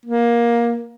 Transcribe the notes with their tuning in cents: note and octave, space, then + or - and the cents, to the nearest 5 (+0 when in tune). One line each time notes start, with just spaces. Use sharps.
A#3 +15